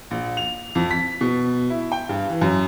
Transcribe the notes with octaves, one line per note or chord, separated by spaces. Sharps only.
A#1
F7
F2
B6
B2
E4
G5
G2
E3
F#2